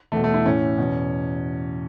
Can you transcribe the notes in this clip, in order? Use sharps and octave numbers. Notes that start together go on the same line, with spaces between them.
E2 B2 A3
A3
E4
A2 E3 C#4
E2 B2